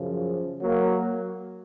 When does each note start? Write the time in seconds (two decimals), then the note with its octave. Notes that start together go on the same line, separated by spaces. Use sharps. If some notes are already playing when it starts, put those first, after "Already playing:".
Already playing: F#2 C#3 F3
0.61 F#3 A#3